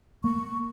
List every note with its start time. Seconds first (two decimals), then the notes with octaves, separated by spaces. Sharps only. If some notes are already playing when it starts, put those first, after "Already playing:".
0.24 A#3 C#6